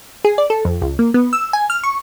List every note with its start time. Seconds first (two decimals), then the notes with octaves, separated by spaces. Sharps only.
0.25 G#4
0.38 D5
0.50 A4
0.65 F2
0.82 C#2
0.99 A#3
1.14 B3
1.33 E6
1.53 G#5
1.70 F6
1.83 C#6